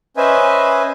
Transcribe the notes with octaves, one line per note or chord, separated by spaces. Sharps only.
C#4 B4 C5 D#5 E5 G#5